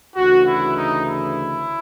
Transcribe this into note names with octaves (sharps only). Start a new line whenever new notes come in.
D2 C#3 E3 F#4
E4
D#4
E4